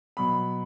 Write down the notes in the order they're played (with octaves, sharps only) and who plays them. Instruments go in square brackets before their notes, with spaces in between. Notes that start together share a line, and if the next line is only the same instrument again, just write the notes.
[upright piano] B2 F#3 B5